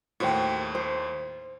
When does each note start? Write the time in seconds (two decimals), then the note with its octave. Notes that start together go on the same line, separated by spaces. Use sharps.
0.20 D#2 A2 F#4 C5 G5
0.75 C5